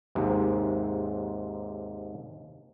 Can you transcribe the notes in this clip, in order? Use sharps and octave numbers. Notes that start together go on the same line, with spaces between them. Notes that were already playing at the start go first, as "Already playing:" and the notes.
D#2 G#2 C3